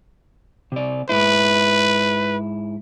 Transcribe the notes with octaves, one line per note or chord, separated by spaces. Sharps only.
C3 D5
G#2 E4 B4